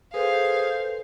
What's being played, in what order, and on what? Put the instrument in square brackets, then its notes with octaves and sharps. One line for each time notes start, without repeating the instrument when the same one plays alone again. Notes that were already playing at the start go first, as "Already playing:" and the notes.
[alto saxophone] G#4 [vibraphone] A4 B4 [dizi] C5 [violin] F5